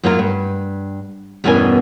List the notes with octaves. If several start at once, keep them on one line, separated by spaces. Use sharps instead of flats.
F#2 F#3 A#3 F4 A4 A#4
G2
E2 G2 B2 C#4 A#4 G#5